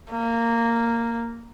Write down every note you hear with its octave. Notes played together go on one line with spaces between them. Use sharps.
A#3